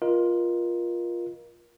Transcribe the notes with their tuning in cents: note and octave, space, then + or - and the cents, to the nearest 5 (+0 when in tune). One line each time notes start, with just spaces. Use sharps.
F4 +0 A#4 +25 D#5 +0